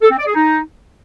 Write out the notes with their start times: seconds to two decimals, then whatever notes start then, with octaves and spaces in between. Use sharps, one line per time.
0.02 A4
0.10 C4
0.18 D5
0.26 G#4
0.34 D#4